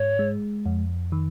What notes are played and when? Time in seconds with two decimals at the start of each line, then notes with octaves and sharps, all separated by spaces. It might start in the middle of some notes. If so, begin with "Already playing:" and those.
Already playing: G#2 C#5
0.19 G#3
0.66 F2
1.12 D#3